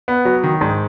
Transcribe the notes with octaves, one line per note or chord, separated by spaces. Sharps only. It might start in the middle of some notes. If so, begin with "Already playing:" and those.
B3
F#3
D#3
G#2